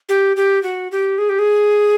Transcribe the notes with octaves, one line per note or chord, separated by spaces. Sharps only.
G4
G4
F#4
G4
G#4
G4
G#4